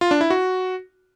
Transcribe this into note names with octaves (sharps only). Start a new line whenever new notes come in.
F4
D4
E4
F#4